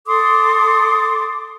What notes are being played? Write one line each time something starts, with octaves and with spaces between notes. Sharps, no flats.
A4 C6 D6 D#6